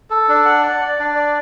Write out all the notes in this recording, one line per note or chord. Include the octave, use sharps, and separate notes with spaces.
A4
D4
F#5
D5
D5
D4
D5